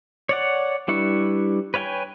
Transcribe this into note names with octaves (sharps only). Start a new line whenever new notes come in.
C#5 D5 F#5
G3 D4 E4 B4 C#6
B4 C#5 F5 G5 G#5